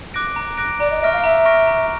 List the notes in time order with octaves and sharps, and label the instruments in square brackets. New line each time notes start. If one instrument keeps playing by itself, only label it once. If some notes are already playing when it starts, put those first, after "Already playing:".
[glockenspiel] D6 F#6 A#6 D7
A#5
D6 F#6 A#6 D7
[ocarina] D5 [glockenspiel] A#5
[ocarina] D#5
[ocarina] E5 [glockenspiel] C#6 F6 A#6 D7
[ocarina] F5
[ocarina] E5 [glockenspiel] A#5
[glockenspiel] C#6 F6 A#6 D7
A#5